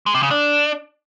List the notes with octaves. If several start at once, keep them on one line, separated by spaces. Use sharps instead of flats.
G#3
C3
C#3
D4